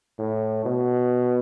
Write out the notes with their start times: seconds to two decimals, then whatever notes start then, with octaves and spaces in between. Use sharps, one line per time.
0.19 A2
0.66 B2